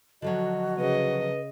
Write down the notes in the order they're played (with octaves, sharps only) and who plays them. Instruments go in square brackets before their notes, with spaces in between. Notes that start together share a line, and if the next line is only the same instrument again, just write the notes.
[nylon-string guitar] D3 F3 F#3 [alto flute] F#4 [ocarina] D#5
[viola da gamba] C#3 D#5 [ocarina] B4